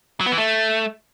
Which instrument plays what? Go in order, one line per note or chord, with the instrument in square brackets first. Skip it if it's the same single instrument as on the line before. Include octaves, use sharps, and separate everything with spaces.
[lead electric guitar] F#3
B3
E3
A3